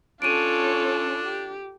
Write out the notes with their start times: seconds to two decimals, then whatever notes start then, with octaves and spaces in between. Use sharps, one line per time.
0.22 C#4 D4 F4 A4 C#5 D7 D#7
1.25 G4